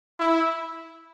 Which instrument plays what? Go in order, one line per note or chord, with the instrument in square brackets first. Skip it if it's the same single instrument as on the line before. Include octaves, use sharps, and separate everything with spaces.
[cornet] E4